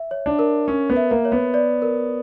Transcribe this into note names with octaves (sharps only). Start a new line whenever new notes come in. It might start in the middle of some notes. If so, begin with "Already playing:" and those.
Already playing: E5
C#5
D4
A#4
C#4 A#4
B3
E5
A#3
C#5
B3
D5
A#4